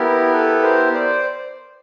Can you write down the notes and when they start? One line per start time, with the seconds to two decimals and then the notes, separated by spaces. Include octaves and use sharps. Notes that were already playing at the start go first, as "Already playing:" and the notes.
Already playing: B3 E4 G4 A#4
0.33 A4 B4
0.63 A#4 C5
0.94 C5 D5